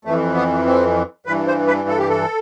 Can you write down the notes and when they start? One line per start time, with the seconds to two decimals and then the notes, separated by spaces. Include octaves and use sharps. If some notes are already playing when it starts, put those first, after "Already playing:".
0.05 F2 E3 A3
0.35 B3
0.66 C4
1.26 G2 E3 B4
1.47 C5
1.67 B4
1.89 A4
1.98 G4
2.09 A4